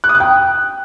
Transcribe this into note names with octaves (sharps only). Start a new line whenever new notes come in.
F#6
D#6
F#6
G5